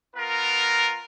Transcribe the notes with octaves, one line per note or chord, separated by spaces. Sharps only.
B3 F4 A#4